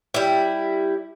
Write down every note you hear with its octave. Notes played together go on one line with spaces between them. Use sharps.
G3 E4